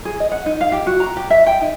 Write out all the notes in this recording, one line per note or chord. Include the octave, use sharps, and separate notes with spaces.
G#4
D#5
F#5
D#4
F5
G4
F#4
A#5
G4
E5
G5
D#4